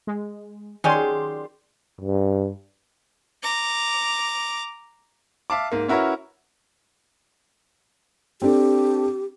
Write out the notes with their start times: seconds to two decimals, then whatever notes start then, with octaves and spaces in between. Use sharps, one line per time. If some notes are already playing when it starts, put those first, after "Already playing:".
0.07 G#3
0.84 D#3 F#3 C#4 G4 G#4 D5 C6
2.01 G2
3.43 A#5 D6
5.50 E5 F5 A5 D6
5.72 G#2 A#3
5.88 C#4 E4 F#4 A#4 B4 C#5
8.42 C4 D4 G4 A4